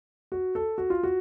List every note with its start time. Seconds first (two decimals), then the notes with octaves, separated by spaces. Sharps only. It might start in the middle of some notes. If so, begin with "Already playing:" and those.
0.32 F#4
0.55 A4
0.78 F#4
0.90 F4
1.03 F#4